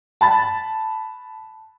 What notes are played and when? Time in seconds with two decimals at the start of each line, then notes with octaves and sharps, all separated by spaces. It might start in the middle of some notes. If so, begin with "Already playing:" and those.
0.21 A5 B5 A6